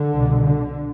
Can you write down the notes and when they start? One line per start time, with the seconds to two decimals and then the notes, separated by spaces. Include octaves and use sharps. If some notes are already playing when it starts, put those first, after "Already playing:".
Already playing: D3
0.14 C2 B2
0.44 D3